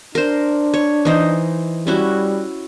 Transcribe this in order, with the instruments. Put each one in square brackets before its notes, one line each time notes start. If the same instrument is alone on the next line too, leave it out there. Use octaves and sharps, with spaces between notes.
[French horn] D4 [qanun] A#4 C5
[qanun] C#5
E3 D#4 C5
[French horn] G3 [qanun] C#4 E4 F#4